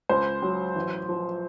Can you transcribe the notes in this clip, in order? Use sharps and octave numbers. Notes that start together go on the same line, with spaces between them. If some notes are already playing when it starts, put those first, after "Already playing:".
C#2 C5
F#3
A1
F3